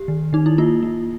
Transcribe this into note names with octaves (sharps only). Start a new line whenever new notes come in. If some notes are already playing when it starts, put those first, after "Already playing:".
Already playing: G4
D#3
D#3 D#4
E4
A#3 F4
A#3